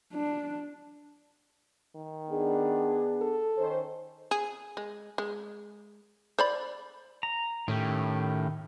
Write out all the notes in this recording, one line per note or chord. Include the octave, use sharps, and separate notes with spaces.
D4
D#3
B3 D4 G#4
A4
D#3 C#4 C5
G#4
G#3
G#3
C5 D5 B5
A#5
A2 D#3 C#4 G4